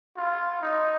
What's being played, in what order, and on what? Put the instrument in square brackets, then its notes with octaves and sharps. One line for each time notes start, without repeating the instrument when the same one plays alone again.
[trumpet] F4
D#4